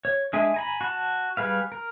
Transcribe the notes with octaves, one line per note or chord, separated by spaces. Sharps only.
C#5
G#3 D4 G#4 E5 G#5
G#5 A#5 B5
F#4 A5
G3 G#4 B4 F5
A#4